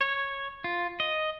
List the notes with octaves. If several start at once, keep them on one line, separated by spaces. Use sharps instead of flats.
C#5
F4
D#5